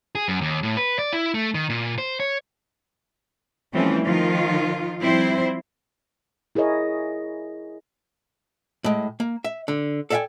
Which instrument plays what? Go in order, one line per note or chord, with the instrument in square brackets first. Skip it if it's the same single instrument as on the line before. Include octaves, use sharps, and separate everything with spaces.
[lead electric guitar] G#4
F#2
D#2
A2
B4
D5
E4
A3
D#3
A#2
C5
C#5
[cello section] E3 F3 G3 A3 C4 C#4
D#3 F3 F4
F3 G3 C4 E4 C5
[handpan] E4 G#4 A#4 C#5 D#5
[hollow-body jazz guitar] A2 G#3
A#3
E5
D3
A4 D5 E5 F5 G5 G#5